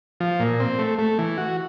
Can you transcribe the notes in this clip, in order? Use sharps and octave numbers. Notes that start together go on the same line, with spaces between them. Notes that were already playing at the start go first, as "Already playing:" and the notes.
F3
A#2
C4
A3
A3
E3
F#4